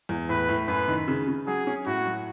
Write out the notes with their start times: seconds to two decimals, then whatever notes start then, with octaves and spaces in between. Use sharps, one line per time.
0.09 E2
0.29 A2 B4
0.49 A2
0.68 F#2 B4
0.88 D#3
1.08 C#3
1.27 C#3
1.47 F#3 G#4
1.67 C#4
1.86 A2 F#4
2.06 F#3